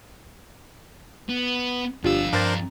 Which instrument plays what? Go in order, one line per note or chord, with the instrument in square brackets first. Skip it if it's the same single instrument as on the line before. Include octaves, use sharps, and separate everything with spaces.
[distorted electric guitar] B3
[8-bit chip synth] G1 E6 [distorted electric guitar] F2 F5 [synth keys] D4 F4 G4
[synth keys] G2 A#5 A6 [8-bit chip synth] D4 A#4 C5